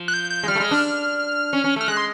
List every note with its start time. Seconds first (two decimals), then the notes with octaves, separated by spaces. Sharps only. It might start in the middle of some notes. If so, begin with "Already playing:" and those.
Already playing: F3
0.08 F#6
0.14 G6
0.30 G6
0.43 G#3
0.48 G3 F6
0.55 A3
0.60 G#3
0.71 D4
1.53 C#4
1.64 C#4
1.76 A3 F6
1.88 G#3 F#6
1.97 C6